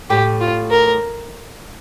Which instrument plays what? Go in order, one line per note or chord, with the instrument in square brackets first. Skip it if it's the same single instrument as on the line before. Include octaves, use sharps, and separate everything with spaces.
[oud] A2 [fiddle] G4
[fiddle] F4
A#4